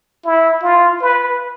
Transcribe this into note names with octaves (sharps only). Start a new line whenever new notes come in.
E4
F4
B4